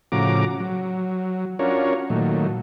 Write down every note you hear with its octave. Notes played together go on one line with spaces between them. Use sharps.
A2 C#3 F3 F#4 A#5 D6
F#3
C#4 D4 F4 F#4 A#4 C#5
A#2 D#3 F#3 A3